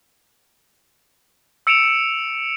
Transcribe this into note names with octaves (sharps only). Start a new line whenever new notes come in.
E6 C#7 D7 E7 F7